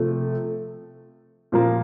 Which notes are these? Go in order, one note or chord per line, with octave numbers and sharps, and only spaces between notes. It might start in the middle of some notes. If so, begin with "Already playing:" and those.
Already playing: C3 F3 A3
A#2 F3 A#3